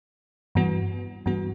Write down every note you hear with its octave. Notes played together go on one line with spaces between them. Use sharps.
G2 E3 B3 F#4
G2 E3 B3 F#4